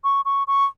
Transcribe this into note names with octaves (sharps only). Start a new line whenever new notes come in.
C#6
C#6
C#6